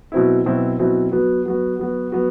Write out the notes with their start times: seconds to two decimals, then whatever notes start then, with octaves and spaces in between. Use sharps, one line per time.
0.12 B2 F#3 C4 E4
0.46 B2 F#3 C4 E4
0.79 B2 F#3 C4 E4
1.12 F#3 B3 F#4
1.46 F#3 B3 F#4
1.79 F#3 B3 F#4
2.12 F#3 B3 F#4